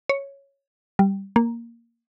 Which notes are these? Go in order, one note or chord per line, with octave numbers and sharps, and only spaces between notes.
C#5
G3
A#3